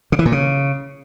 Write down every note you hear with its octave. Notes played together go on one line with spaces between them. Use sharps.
C#3
E3
A#2
C#3